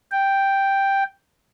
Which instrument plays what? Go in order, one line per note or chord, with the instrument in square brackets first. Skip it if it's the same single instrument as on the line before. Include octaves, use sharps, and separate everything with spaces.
[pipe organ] G5